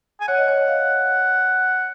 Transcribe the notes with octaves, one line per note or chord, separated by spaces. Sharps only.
G#5
C#5 F#5
D#5
C#5
D#5
F5